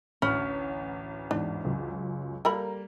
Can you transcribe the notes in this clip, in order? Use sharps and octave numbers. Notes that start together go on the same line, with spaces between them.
A1 D2 C#4 B5
E2 G#2 D4
C#2 F#2
G3 A#3 A4 A#4 A#5 B5